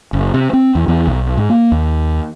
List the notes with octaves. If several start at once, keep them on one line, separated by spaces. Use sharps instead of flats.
F#1
C3
C4
E2
E2
B1
G#2
A#3
D#2